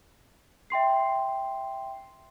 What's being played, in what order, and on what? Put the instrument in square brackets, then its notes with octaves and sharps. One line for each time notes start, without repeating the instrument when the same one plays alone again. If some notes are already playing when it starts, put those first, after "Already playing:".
[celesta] E5 G5 C6 C7